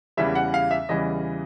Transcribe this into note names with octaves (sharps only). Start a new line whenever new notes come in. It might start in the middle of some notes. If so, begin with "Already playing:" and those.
E2 C#3 E3 G3 E5
F#5
F5
E5
E2 C#3 E3 G3 D#5